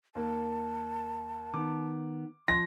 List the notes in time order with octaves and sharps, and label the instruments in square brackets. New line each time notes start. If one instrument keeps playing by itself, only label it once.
[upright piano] D#2 A#3 [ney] A5
[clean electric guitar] D#3 B3 [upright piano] D6
[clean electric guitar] F3 [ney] C6 [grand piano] A#6